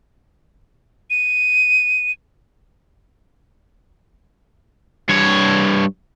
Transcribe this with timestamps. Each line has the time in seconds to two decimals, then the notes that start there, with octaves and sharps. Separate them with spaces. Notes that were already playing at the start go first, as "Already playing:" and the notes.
1.10 D#7
5.09 G2 C#5